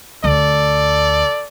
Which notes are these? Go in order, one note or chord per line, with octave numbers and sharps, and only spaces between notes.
D2 A4 D5